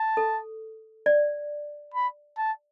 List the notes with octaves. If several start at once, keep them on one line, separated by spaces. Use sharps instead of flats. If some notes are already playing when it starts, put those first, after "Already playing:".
Already playing: A5
A4
D5
B5
A5